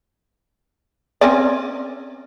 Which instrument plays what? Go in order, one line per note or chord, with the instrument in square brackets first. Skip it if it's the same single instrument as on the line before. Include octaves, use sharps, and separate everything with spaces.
[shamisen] C4 C#4 D5